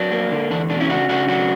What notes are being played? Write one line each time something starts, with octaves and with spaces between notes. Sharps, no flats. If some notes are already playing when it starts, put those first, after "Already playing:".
Already playing: F#3 D4
A#3
D3
E2 D4
B2 D4
C#4 E4
C#3 D4 F#4
C#3 D4 F#4
F#3 D4 F#4